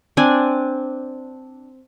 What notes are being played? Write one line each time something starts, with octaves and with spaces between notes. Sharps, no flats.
C4 D4 G#5